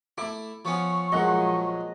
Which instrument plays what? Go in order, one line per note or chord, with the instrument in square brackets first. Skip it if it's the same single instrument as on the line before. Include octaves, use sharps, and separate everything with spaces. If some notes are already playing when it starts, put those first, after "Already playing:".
[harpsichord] A3 E4 [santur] D6
[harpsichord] F3 B3 C#4 [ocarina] C#6
[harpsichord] A#2 [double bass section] F3 F#3 G#3 [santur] D#5 F#5